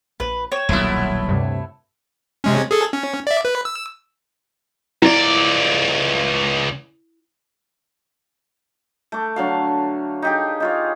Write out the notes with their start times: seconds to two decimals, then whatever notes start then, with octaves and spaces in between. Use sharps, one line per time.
0.20 A#1 B4
0.52 C#5 G5 E7
0.69 D#1 B1 A3 B3 E4 C6
1.29 D2 G2 C3
2.44 C3 G#3 C#4
2.71 G#4 A4
2.93 C#4
3.27 D5 E5
3.45 B4
3.65 E6
5.02 C#2 E4 D5
9.12 A3 D6
9.36 D3 F#3 F5
10.22 D#4 G4 G#4
10.60 D#4 F4 C#5